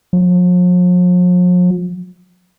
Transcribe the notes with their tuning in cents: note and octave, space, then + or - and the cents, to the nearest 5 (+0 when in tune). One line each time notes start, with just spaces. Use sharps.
F3 +45